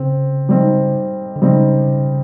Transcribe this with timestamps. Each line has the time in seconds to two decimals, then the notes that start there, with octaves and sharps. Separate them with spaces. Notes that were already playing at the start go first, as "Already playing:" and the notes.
Already playing: C#3 C4
0.49 G3 C4 D#4
1.36 D3
1.42 C#3 G3 C4 D#4